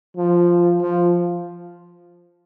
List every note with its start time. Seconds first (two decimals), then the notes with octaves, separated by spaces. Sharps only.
0.17 F3
0.80 F3